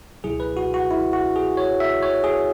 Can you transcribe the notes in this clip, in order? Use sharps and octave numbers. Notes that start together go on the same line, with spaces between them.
C#2 B2 F#3 E4 G#4
B4
F#4
F#4
E4
F#4
G#4
C#5
E5
C#5
G#4